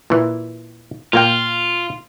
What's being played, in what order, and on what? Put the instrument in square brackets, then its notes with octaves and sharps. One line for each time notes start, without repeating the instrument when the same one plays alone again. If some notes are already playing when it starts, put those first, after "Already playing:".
[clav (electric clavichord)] A#2 E3
[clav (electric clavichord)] A#2 A#3 G5 [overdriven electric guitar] F4